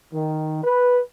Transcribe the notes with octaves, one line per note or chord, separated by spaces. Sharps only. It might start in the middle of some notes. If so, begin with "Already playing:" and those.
D#3
B4